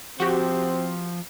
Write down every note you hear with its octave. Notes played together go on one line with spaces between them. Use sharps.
F3 C4 F#4 G4